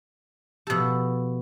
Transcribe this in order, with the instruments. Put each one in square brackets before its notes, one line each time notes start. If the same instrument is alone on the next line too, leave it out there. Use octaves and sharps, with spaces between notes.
[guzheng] B2 A4 [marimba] F3 G4